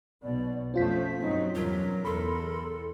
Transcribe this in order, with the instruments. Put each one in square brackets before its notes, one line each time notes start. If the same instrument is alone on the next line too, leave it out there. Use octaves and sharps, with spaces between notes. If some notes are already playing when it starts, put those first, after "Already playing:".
[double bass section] B1 B2 [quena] D5
[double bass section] F2 F3 A3 [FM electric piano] C#4 F4 B6 [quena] C5
[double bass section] G2 F#3 C4 [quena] D#4
[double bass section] E2 G2 B2 [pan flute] F#3 [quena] A#4
[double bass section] E2 [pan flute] A4 [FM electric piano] B5 C6